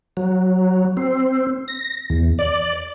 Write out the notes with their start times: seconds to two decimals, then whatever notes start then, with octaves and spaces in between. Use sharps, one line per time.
0.17 F#3
0.97 C4
1.68 A#6
2.10 E2
2.39 D5